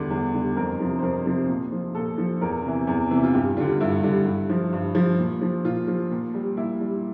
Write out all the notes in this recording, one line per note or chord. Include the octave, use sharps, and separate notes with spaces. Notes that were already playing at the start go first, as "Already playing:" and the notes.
Already playing: E2 D3 G3 D4
E2
D3 G3
F2 A#4
C3 F3
C5
F2 A#4
C3 F3
A#2
F3
A#2 A4
F3
E2 A#4
C3 E3
E2
C3 E3
F4
G2 G4
D3 G3 F4
G2 E4
D3 G3
G2
F3
G2
F3
A#2
F3
A#2 F4
F3
A#2
G3
A#2 E4
G3